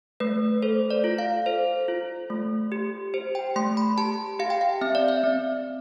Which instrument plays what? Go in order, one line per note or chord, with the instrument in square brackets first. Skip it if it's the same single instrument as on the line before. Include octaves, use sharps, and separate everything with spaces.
[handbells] A3 B4
A4 C5
D5
F4
F5
A4 C5
F4
A3
G4
G4 C5
G5
A3 C6
B5
G4 A5
G4 F5
G5
F5
C4 E5
D5
E5
C4